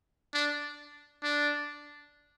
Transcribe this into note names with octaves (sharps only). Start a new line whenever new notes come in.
D4
D4